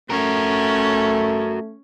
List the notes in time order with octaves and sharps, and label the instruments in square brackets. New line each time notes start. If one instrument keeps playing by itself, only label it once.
[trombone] A3 [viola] C#4 [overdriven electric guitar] F#4 A#4